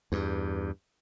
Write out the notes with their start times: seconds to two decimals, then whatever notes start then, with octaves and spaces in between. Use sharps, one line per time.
0.12 E2 G2